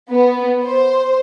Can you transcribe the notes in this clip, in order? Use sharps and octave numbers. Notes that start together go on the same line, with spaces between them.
B3
C5